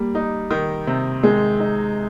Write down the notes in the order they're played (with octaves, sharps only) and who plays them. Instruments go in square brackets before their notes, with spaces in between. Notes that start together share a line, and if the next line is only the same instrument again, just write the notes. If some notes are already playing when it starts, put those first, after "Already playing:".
Already playing: [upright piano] G3 [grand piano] A#3
[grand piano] D#4
D#3
C3
[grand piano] D#3 [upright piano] G#3
[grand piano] D#4